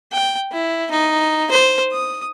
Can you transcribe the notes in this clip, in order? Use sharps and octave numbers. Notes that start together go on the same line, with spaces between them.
G5
E4
D#4
C5
D#6